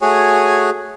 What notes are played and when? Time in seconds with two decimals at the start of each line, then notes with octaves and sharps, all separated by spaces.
0.02 A3 F#4 G#4 C#5 G#5